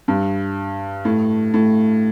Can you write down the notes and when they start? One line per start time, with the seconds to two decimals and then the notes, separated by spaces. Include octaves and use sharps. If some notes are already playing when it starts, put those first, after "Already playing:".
0.08 G2
1.05 A2
1.54 A2